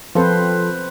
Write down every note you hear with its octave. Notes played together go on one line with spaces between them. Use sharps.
F3 C4 F4 A4 B4 C5